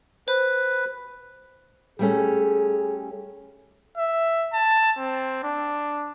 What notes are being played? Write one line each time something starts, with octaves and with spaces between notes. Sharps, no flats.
B4 C5
G3 A3 C#4 G#4
E5
A5
C4
D4